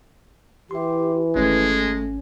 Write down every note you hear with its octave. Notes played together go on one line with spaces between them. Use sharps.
E3 G4 E5 C6
G#1 G#3 A3 C#4